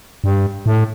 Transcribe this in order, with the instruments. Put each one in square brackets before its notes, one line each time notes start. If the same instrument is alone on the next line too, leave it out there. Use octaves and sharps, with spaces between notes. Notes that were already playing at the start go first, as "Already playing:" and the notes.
[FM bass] G2
A2